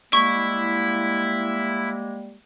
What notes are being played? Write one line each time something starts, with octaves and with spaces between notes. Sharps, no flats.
G3 G#3 A#3 E4 C#6